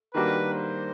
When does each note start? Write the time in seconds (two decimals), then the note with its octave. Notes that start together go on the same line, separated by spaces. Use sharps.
0.14 D#3 G3 A#3 D4 F#4 B4
0.53 C5